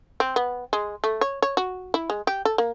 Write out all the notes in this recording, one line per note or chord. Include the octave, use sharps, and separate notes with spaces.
C4
B3
G#3
A3
C#5
C#5
F#4
E4
G#3
G4
A4
A#3